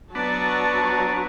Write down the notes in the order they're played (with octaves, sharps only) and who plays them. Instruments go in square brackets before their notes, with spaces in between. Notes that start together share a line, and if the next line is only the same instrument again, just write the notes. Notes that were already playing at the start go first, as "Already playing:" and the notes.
[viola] F#3 A#5 [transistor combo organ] B3 D4 [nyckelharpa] B4 D5 [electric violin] A5 C#6